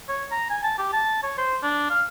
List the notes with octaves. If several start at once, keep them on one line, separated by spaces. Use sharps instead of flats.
C#5
A#5
G#5
A5
G4
A5
C#5
C5
D4
F5